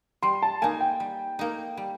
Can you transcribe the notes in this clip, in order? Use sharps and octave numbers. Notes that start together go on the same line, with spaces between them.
G3 C6
A5
A#3 D#4 G#5
G5
G3
A#3 D#4
G3